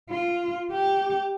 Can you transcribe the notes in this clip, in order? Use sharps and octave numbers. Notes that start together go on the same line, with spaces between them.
F4
G4